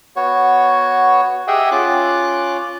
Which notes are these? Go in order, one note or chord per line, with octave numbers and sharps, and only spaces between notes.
B3 F#4 C#5
G4 G#4 D#5 E5 F#5 G5
C#4 F4 D6 F#6